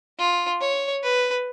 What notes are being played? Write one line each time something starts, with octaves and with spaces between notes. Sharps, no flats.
F4
C#5
B4